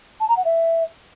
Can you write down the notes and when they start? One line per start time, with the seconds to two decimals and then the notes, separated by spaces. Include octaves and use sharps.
0.20 A5
0.29 A#5
0.37 F#5
0.45 E5